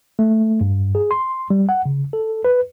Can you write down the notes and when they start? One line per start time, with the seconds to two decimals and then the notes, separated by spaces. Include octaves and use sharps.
0.19 A3
0.61 G2
0.95 G#4
1.11 C6
1.50 G3
1.69 F#5
1.86 C#3
2.13 A4
2.45 B4